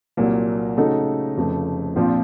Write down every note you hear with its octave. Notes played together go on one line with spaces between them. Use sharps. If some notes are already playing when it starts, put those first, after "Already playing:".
C2 A#2 F#3 A#3
C#3 A3 D#4 F#4 A4
F1 F2 C#3 F3 A3
A#1 A#2 F3 C4 F4